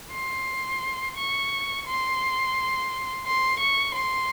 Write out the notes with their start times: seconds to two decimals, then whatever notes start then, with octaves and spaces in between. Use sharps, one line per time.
0.12 C6
1.17 C#6
1.86 C6
3.26 C6
3.60 C#6
3.95 C6